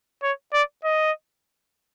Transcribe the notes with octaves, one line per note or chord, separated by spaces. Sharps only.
C#5
D5
D#5